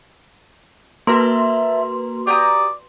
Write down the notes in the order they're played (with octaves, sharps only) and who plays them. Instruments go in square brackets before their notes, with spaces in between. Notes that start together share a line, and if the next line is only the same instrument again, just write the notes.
[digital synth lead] A#3 [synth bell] F#4 B4 C6 [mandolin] A4 E5
[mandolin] G4 A#5 D#6 [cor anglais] D5